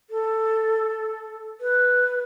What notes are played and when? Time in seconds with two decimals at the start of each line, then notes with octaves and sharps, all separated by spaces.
0.10 A4
1.61 B4